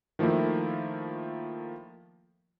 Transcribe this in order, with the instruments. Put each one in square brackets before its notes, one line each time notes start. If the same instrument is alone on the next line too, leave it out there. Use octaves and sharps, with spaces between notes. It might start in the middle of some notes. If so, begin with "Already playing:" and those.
[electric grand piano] D#3 F3 A3 A#3 E4